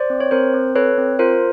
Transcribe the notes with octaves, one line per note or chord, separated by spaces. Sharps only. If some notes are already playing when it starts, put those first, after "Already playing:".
Already playing: C5 D5
C4
C#5
C4 A#4 C5
C4
A4 B4 C#5
C4
F4 A#4 C5